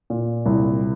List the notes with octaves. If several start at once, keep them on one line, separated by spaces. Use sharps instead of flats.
A#2
C2